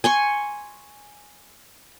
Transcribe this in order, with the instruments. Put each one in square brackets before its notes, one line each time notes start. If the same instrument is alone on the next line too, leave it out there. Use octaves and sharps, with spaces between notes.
[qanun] G#5 C6 C#6